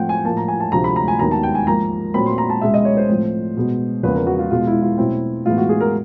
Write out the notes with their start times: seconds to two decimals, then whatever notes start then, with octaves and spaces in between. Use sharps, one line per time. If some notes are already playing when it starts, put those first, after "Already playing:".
Already playing: A2 F3 A3 C4 F#5 G5
0.09 G#5
0.25 A2 F3 A#3 A5
0.37 A#5
0.48 G#5
0.60 A5
0.72 D2 C3 F3 A3 C4 A#5
0.84 B5
0.96 A#5
1.08 G#5
1.19 D#2 D#3 F#3 B3 A#5
1.31 A5
1.43 G5
1.55 G#5
1.67 G#2 F3 A#3 A#5
2.14 A#2 F#3 A3 C4 B5
2.26 C6
2.38 A#5
2.50 A5
2.61 C#2 B2 G#3 E5
2.74 D#5
2.85 C#5
2.97 C5
3.09 A2 F3 A3 C4
3.57 B2 G#3 B3
4.03 E2 C#3 F3 A#3 B4
4.15 A#4
4.27 F#4
4.39 F4
4.50 B2 G#3 B3 F4
4.67 E4
4.82 F4
4.98 B2 F#3 A3 C4 E4
5.46 A2 E3 G#3 B3 F4
5.57 F#4
5.69 G#4
5.81 A#4